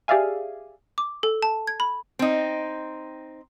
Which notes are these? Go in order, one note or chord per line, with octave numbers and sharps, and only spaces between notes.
G4 G#4 D5 E5 F5 G#5
D6
A4
A5
G#6
B5
C4 D#4